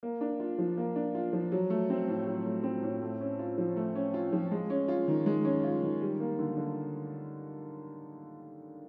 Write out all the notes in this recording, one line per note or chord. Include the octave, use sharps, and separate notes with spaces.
A#3
D4
F4
F3
A#3
D4
F4
F3
F#3
A3
C4
A2
F#3
A3
C4
A2
A3
C#4
F4
F3
A3
C#4
F4
F3
G#3
C#4
F4
D#3
G#3
C#4
F4
D#3
G3
A#3
D3
D3